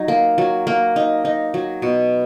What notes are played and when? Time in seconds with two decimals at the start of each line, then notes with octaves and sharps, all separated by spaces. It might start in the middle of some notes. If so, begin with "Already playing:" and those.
Already playing: F#3 D#4
0.08 A#3
0.38 F#3
0.67 A#3
0.96 D#4
1.25 D#4
1.54 F#3
1.82 B2